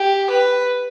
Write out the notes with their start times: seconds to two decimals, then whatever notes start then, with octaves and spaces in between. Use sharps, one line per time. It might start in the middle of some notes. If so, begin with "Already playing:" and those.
Already playing: G4
0.31 B4